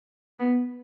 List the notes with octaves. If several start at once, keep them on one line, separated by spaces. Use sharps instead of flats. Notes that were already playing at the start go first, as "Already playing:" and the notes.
B3